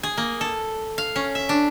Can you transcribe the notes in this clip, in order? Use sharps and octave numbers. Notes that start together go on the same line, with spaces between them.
G#4
A#3
A4
F5
C#4
E5
D4